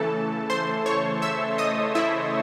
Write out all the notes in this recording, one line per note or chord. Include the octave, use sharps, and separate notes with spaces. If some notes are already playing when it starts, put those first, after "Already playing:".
Already playing: C#3 E3 A3 A4 A5
C5 C6
C#5 C#6
E5 E6
D#5 D#6
E4 E5